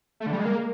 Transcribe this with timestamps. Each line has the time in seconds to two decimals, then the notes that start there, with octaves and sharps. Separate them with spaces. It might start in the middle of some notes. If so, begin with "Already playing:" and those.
0.20 A3
0.27 D3
0.33 G3
0.39 G#3
0.45 A#3